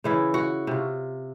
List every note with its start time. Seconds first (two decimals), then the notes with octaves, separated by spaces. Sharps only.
0.04 C#3 E3 E4
0.34 F#4 F#5
0.67 C3 F4